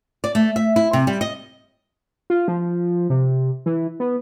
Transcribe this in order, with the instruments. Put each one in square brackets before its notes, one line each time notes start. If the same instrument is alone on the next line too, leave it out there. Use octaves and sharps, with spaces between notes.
[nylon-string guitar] D5
A3
E5
E4
C3
G3
D#5
[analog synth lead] F4
F3
C3
E3
B3